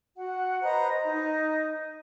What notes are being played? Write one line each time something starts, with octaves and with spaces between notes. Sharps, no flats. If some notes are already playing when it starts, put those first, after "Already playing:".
F#4 F#5
B4 C5 D#5 A#5
D#4